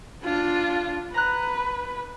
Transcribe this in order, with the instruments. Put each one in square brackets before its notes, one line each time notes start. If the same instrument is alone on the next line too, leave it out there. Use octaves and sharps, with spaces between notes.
[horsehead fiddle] D4 F4
[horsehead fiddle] B4 [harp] A#5 F#6